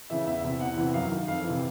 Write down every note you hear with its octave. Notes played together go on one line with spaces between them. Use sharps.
C#3 E3 E5
E2 E5
C3 E3
E2 F#5
C3 E3
F#2 F5
D#3
F2 F5
E3
C3